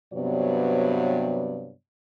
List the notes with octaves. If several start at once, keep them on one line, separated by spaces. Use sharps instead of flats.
G2 C3 F#3 B3 C#5 D5